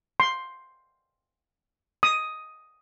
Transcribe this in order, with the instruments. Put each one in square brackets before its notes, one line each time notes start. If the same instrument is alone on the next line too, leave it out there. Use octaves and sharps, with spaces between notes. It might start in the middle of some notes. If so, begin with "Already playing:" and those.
[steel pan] C6
D#6